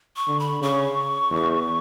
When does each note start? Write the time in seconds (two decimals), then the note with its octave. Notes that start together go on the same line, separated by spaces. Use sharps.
0.16 C#6
0.28 D3
0.40 B5
0.61 C#3 C#6
1.31 E2